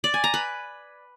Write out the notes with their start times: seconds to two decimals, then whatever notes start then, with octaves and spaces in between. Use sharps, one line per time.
0.04 D5
0.14 G#5
0.24 A#5
0.34 B4